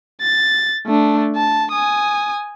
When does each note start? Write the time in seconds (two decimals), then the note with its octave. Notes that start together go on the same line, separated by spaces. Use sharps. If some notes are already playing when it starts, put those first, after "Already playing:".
0.21 A6
0.86 A3 D4
1.36 A5
1.72 G#5 D#6